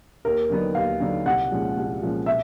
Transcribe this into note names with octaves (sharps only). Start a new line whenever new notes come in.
D#2 A#4
D3 F#3 B3 D#4
D#2 F5
D3 F#3 B3 D#4
C2 F#5
A#2 F3 G#3 C#4
C2
A#2 F3 G#3 C#4
B2 E5